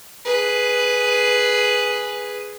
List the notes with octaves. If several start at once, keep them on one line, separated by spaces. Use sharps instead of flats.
G#4 B4